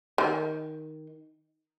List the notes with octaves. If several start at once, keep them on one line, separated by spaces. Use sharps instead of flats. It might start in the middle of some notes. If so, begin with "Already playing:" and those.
D#3